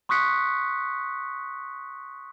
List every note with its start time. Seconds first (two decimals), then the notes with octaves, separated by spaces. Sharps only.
0.09 C6 C#6 D#6 F#6 B6 C#7